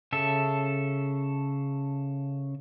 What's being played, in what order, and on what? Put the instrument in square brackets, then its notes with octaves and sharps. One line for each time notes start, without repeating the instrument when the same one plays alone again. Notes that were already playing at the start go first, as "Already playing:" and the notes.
[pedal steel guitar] C#3 A4 E5